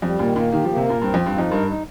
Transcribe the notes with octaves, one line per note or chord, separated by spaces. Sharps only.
F2 G3
A#2 D#3
A#2 A#3
D#3 G4
F3
A#3
C3
A#2 A#4
G2 C4
F2
F3
G2
F2 D#4
G2 A#4
D#4